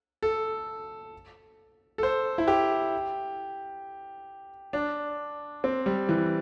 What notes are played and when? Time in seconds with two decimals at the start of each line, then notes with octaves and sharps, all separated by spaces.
0.23 A4
1.98 A4
2.03 C5
2.38 E4
2.48 G4
4.73 D4
5.64 C4
5.86 G3
6.09 E3